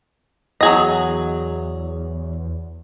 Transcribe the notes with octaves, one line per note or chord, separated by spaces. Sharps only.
E2 F#3 G#4 D#5